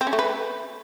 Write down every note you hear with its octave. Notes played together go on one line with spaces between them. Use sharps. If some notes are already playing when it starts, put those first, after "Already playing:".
C4
C#4
A3
B4